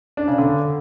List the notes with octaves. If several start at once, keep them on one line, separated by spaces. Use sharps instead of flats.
D4
C#3
D3